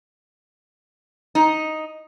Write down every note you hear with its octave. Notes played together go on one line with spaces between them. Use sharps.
D#4